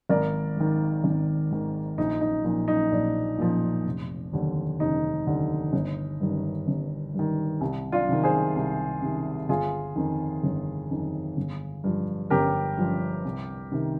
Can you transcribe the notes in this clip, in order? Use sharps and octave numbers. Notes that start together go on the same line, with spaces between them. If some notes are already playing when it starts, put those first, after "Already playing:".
G#1 A#4 D5
G#2 D#3
G#1
G#2 D#3
A#1 D#4
D#4
A#2 F3 D#4
D#4
A#1 D4
A#2 F3
F1
D#2 D3
F1 D#4
D#2 D3
G1
G2 D#3
G1
G2 D#3
C2
D4 F4
C3 D#3
G#4 C5
C2
C3 D#3
G1 F4 G#4
F2 D#3
G1
F2 D#3
G1
G2 F3
G1 G4 A#4
G2 F3
C2
C3 D#3